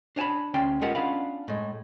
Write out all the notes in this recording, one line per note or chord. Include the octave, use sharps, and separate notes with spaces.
D4 C#5 G#5 A5 B5
D2 C#4 D5 G5 C6
G#3 B3 F4 G4 A#4 F#5
B3 C#4 D4 F4 F5 B5
A2 G#3